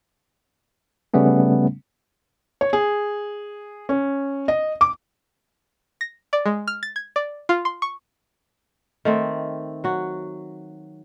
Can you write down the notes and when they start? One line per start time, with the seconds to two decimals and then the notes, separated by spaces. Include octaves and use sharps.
1.14 C#3 G3 A3 B3 C#4
2.61 C#5
2.73 G#4
3.89 C#4
4.48 D#5
4.81 D6
6.01 A#6
6.33 D5
6.46 G#3
6.68 F6
6.83 A6
6.96 G#6
7.16 D5
7.49 F4
7.65 C6
7.82 C#6
9.05 D#3 A3 C4
9.84 F#3 F#4